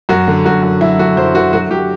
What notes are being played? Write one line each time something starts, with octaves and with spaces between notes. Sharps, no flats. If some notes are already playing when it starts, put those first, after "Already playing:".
F#2 F#4
D3
F#2 F#4
F#2
F#3 E4
D3 F#4
F#2 C5
D3 F#4
F#3 F#4
F#3 G4